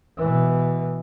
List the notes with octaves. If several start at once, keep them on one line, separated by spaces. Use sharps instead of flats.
B2 E3